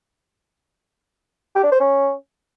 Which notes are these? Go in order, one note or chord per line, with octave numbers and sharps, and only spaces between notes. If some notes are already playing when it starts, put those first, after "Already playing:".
G4
D4
C5
C#4